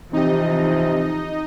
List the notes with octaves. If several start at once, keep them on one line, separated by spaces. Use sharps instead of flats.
C3 E3 F3 C4 D#4 G4 D#5